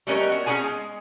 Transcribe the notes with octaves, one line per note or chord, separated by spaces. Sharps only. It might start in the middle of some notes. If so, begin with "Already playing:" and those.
G3 A3 B3 C#4 A#4 D#5
F#4
C#4 D#4 F4 G#4 G#5
G#3